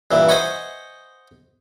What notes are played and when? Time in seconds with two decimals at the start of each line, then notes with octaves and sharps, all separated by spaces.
0.11 G2 A#2 E3
0.29 C5 D#5 F#5 G#5 B5 C#6